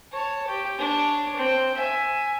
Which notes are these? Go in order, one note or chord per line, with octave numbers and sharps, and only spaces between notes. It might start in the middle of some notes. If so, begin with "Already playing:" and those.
C#5 A5
G4
D4 C#5
C4 G5
E5 G#5